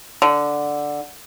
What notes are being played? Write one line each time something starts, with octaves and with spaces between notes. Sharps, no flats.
D3